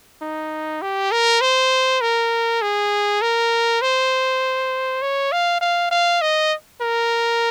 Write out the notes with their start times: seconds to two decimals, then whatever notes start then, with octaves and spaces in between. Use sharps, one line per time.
0.22 D#4
0.82 G4
1.12 A#4
1.41 C5
2.01 A#4
2.62 G#4
3.21 A#4
3.82 C5
5.02 C#5
5.32 F5
5.61 F5
5.91 F5
6.22 D#5
6.81 A#4